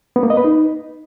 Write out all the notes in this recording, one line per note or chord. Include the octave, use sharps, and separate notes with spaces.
B3
A#3
D#5
B4
D#4